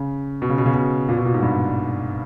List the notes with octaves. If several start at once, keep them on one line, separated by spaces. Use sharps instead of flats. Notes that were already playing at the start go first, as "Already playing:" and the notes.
Already playing: C#3
B2
C#3
B2
C#3
B2
A#2
B2
A#2
G#2
G2